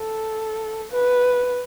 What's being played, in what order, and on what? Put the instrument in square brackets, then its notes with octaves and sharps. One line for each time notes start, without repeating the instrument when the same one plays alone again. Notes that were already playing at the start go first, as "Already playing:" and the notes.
Already playing: [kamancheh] A4
B4